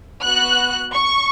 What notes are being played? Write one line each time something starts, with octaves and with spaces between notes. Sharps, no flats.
B3 F#4 F#6
C#6